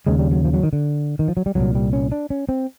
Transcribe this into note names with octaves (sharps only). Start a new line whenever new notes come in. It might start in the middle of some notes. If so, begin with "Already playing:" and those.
D#2 C#3 G#3
G3
F#3
F3
F#3
D#3
D3
D#3
F3
F#3
G3
C2 A#2 F#3
G3
C#4
D4
C#4
C4